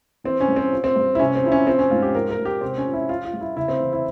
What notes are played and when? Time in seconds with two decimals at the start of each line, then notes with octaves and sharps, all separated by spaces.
0.24 E3 C4
0.41 C#4
0.48 G2
0.56 C4
0.72 F3
0.84 C4
0.96 G2
1.15 E4
1.19 C3 C#4
1.35 C4
1.44 F3 E4
1.52 C#4
1.66 F3 C4
1.79 C#4
1.90 G#2 F4
2.02 G4
2.14 F3 A#4
2.31 A#4
2.38 G#2
2.45 G4
2.61 C3 C4
2.78 C#4
2.86 F3
2.93 E4
3.09 F3 F4
3.25 F4
3.33 G2
3.41 E4
3.56 C#3 E4
3.68 C4
3.80 E3
3.93 E4